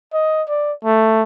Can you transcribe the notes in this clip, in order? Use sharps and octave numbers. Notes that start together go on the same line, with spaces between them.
D#5
D5
A3